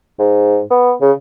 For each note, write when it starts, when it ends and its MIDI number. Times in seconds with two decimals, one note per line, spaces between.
0.19 0.61 44
0.70 0.93 59
1.01 1.12 49